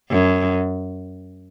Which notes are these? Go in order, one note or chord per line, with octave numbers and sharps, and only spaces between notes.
F#2